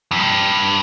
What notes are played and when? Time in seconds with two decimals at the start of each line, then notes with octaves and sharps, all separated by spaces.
0.11 F2
0.19 G2